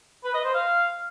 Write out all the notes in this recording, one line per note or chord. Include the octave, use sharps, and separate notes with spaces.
B4
D#5
C5
F5